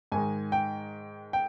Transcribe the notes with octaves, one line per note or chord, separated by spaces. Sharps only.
G#2 D#3 G#3 G#5
G5
G5